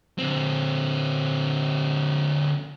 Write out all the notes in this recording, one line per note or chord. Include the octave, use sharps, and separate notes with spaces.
D3 C4